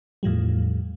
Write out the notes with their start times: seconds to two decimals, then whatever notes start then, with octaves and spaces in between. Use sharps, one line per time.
0.23 E2 A2 F3 G3